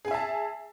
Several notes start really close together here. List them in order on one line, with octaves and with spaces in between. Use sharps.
G#4 G#5 E5 A5